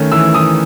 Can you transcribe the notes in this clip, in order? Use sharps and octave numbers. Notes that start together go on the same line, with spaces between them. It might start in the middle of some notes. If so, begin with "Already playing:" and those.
Already playing: D#3 A3 C#4
E3 E6
E3 D#6